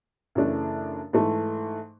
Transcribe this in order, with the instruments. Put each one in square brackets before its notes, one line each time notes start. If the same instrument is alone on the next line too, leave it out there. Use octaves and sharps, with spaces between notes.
[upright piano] F#2 C#3 E3 A3 D4
G#2 E3 A3